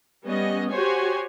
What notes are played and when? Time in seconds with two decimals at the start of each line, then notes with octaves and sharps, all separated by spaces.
0.25 G3 B3 C#4 D#5
0.71 F#4 G4 C5 C#5 G#5